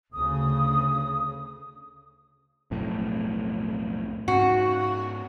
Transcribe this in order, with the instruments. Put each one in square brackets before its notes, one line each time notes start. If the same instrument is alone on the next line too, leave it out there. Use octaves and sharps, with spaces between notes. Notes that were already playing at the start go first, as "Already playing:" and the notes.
[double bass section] D2 C#3 [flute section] D#6
[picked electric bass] B1 F2 A2
[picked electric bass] G#2 C#4 [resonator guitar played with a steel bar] F#4